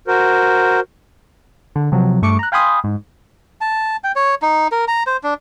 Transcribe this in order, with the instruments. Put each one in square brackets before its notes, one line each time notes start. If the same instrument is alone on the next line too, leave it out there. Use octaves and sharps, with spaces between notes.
[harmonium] F#4 A#4 C5
[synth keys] D3
C3 F3 F#3
G2 A3 C#6 D6 C#7
A#5 F#6
F5 G5 G#5 B5 C6 D#6
G#2
[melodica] A5
G5
C#5
D#4
A#4
A#5
C5
D4